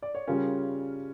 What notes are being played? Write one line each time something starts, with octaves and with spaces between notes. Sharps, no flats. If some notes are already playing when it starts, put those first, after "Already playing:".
D5
C#5
C#3 G3 C#4 F4 A#4